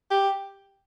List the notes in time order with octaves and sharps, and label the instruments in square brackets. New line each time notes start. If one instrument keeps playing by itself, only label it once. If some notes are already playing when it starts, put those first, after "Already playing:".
[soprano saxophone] G4